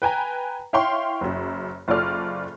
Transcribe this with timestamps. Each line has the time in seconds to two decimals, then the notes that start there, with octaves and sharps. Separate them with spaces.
0.02 B4 G5 G#5 A#5
0.73 E4 C#5 F5 G5 C6 C#6
1.21 F#1 F#2
1.88 F#1 F4 A4 D5 F6